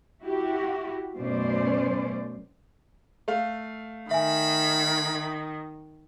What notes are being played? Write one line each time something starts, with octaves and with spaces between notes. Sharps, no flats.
E4 F#4 G4
F#2 B2 A3 C#4 C5 D5
A3 F5
D#3 E5 G#5 B5